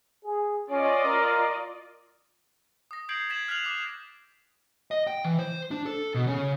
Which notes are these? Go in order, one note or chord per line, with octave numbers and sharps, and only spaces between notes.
G#4
C#4 F4 D5 D#5
A#4
D#6 A#6
D#6 G6 G#6 C7 D7 F#7
G#6 A6 B6 E7 F#7
F6 F#6 B6 C7 F7 F#7
D6 C7
D#5
G5
E3
C5
D4
A4
B2
C#3